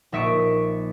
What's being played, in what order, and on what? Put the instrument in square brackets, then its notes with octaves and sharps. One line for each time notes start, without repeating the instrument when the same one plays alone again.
[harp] A#1 D#4 E5 C#6 D#6 D7